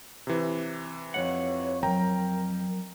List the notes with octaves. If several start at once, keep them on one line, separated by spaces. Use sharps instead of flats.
C3 E3
F2 G#2 C#5 F#5
F#3 A#4 G5 A#5